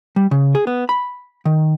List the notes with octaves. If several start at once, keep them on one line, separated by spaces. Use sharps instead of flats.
G3
C#3
G#4
B3
B5
D#3